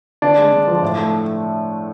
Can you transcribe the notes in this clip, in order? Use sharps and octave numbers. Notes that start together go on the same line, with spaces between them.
D3 D4
G#3
D3
F3
A2
A3